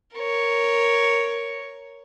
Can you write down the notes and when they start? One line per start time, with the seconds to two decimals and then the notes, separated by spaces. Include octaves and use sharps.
0.16 A#4 C#5